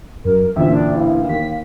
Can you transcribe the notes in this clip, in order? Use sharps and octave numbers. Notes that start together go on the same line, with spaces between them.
F#2 A#4
A1 D2 A#2 F4 E5
D4
E3 F5
D#2 B6